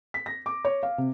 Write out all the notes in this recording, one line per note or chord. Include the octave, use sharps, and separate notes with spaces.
B6
A#6
D6
C#5
F5
C3